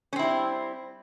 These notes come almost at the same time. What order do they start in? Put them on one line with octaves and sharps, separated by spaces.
C#4 C4 E4 G3